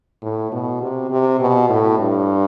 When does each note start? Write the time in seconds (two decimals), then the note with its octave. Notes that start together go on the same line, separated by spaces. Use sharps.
0.22 A2
0.52 B2
0.82 C3
1.10 C3
1.40 B2
1.70 A2
1.99 G2